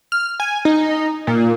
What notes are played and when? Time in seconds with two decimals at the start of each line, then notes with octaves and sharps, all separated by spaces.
0.12 F6
0.40 G#5
0.65 D#4
1.27 A#2